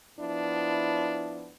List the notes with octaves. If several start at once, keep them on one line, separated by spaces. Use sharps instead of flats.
F3 B3 D4 E4